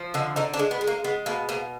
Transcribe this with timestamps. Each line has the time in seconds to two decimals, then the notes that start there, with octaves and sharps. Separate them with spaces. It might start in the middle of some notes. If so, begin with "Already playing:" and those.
Already playing: F3
0.14 D3 D#4
0.36 D3 D#4
0.54 D4
0.59 G#3
0.71 B3
0.81 G#3
0.87 A#3
1.04 G#3 B3
1.26 B2 A#3
1.49 B2 A#3